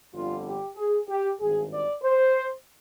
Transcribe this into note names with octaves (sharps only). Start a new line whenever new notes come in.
G1 F2 D3 G3 F4
G4
G#4
G4
G#1 G2 D#3 G#4
D5
C5